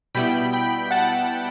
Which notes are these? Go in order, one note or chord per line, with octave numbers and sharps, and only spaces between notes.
B2 G3 B3 E4 G5 B5
G5 B5
F#5 A5